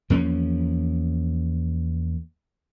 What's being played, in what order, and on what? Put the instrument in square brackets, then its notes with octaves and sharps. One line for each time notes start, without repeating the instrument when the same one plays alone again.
[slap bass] E2 F3 A#3 C#4